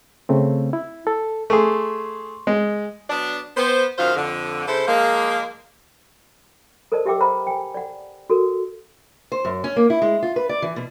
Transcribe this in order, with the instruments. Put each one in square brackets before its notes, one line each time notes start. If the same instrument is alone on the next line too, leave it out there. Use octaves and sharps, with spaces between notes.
[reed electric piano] C#3 A3 C4
E4
A4
[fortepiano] A3 G#4 [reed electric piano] C6 C#6
[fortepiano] G#3
[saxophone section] F#3 B3 D4
B3 C5
F#2 D#3 F4 C5 F5
F2 D3
C#3 E4 A4 C5
F3 G#3 A#3
[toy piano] A4 A#4 C5 D5 D#5 A5
G4 E5 F#5 G5 D6 E6
B4 C5 E5 F#5 A#5 B5
G5 G#5
D5 F#5
F#4 A4 A#4
[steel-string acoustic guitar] C5
F#2
C#4
A#3
E4
G#3
F4
B4
D5
E3
B2